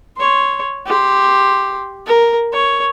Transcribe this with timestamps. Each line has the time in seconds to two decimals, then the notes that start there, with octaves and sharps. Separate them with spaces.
0.17 C#5 C6
0.86 G4 C6
2.07 A#4
2.53 C#5